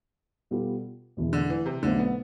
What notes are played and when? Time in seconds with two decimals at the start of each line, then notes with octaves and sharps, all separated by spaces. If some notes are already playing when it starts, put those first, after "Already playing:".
0.51 B2 G3 B3 F4 A4
1.17 E1 E2 B2
1.33 D3
1.50 E3
1.66 C3
1.83 B1 B2 D3 A3 C4
1.99 B3